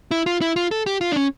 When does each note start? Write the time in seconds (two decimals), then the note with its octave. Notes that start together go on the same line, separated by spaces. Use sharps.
0.11 E4
0.26 F4
0.41 E4
0.56 F4
0.71 A4
0.86 G4
1.01 F4
1.11 D4
1.16 C#4